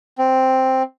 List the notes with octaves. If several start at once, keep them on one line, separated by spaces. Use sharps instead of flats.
C4